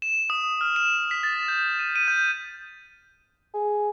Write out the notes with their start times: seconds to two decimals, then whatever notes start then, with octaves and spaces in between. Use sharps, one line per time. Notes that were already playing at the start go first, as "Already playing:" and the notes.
0.02 E7
0.30 D#6
0.61 F6
0.76 E7
1.11 B6
1.23 A6
1.48 G6
1.79 D#7
1.96 D#7
2.08 G6
3.54 G#4